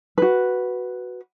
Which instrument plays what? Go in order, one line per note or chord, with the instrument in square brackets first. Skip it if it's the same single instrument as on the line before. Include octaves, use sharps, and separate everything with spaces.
[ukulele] F#4 B4